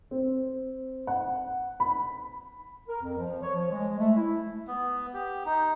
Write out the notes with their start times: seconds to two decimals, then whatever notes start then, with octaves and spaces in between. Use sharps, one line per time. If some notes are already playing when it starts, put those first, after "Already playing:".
0.11 C4
1.07 F#5
1.80 B5
2.89 A#4
3.02 F2
3.18 F3
3.42 C#5
3.54 F3
3.71 G#3
3.99 A3
4.16 E4
4.67 B3
5.14 G4
5.45 D#4